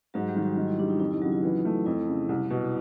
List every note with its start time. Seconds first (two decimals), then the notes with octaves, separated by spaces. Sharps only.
0.14 G#2 F#3 F#4
0.28 G3 G4
0.36 D#3
0.42 F#3 F#4
0.57 D#3
0.68 E4
0.78 G3 D4
0.90 D#4
1.00 F2 D#4
1.11 E4
1.21 C#3 F#3 F#4
1.32 F4
1.43 E3
1.65 A3
1.86 F2 E4
2.07 C#3
2.29 C2
2.50 B2